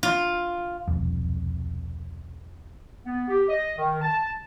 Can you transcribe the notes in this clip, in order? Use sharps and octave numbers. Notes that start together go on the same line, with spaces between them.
F4
E1 C2 F2
B3
G4
D#5
D#3
A5